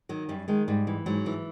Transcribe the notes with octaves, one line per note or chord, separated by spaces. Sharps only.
D#3 F#3
F#2 G3
D#3 G#3
G#2 G3
E3
G#2 F#3
E3